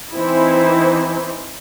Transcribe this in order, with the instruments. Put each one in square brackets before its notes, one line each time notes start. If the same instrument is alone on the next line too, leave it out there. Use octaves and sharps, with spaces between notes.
[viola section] E3 C4 D#4 E4